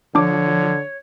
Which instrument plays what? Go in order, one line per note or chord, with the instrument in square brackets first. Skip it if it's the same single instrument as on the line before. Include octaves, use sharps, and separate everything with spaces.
[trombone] D3 [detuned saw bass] F3 [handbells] D4 D6 [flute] C#5